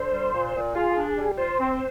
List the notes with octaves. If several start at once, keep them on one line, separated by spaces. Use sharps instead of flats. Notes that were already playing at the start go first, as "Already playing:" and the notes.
Already playing: D3 C5
G3
A#2
A#2
F4 G#4
D4
G3
F4 C5
C4